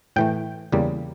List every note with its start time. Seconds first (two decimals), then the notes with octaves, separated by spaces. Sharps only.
0.16 A2 E3 A3 G5
0.72 E2 C#3 G3 A#3